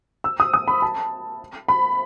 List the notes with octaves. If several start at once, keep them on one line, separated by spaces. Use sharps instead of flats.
E6
D#6
D#6
B5
A5
B5